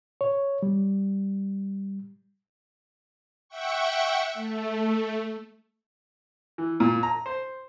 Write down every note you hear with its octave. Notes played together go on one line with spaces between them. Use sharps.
C#5
G3
E5 F#5 G5 C#6
A3
E3
A#2
A#5
C5